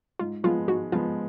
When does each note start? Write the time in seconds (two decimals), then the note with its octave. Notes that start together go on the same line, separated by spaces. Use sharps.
0.19 G#2 F4
0.44 F3 G#3 B3 F4
0.68 G#2 F#4
0.92 F3 G#3 B3 F4